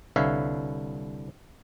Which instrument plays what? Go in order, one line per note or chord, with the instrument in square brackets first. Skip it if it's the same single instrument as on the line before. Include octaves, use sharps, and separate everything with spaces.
[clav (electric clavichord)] C2 D3 B4 C#5 E5 F5